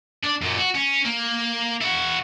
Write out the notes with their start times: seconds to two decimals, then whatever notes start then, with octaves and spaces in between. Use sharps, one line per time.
0.24 D4
0.42 F#2 A#2
0.58 F#4
0.75 C#4
1.05 A#3
1.81 E4 F#4